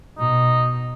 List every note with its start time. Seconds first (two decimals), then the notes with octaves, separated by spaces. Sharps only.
0.18 B2 D#4